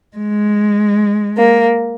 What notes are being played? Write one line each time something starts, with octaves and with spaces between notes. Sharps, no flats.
G#3
A#3